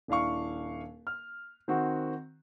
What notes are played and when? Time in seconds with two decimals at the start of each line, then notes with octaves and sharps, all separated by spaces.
0.08 D#1 D4 E4 F5 C#6
1.07 F6
1.68 D#3 C4 F#4